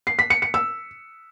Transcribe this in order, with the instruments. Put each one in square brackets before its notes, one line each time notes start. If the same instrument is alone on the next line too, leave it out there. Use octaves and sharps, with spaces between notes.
[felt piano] C7
B6
C#7
C#7
E6